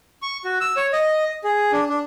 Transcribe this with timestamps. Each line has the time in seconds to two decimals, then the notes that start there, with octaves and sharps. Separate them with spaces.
0.22 C#6
0.45 F#4
0.61 E6
0.77 C#5
0.93 D#5
1.44 G#4
1.72 D4
1.89 D4